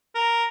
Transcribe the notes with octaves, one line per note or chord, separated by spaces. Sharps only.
A#4